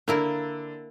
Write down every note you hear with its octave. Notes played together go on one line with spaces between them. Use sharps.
D3 A#3 E4 A#4